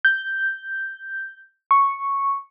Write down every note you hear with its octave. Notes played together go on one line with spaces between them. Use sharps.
G6
C#6